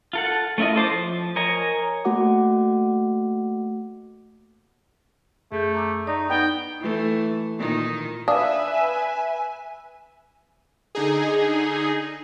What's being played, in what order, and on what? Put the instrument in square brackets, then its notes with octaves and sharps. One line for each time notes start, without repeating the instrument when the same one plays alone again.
[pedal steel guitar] F4 A4 F#5
A3 C#4 E4 F4 D#5
A4 C5 D6
F3
A#4 C#5 D#5 G#5 A#5
[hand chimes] A3 A#3 F#4 F#5 D6
[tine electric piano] F#2 G6 [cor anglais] A3 [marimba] G#4
[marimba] A#5 D6 E6
[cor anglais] D#4 [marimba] D5 C#6
[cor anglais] B3 [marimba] D#4 [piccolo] G5
[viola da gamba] E3 A3
A#2 D#3 D#4
[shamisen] D4 [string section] B4 E5 [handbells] F5 D#6 [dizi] G#5
[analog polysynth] D3 D#4 G#4